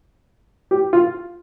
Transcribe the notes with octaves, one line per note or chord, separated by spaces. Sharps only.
G4
F4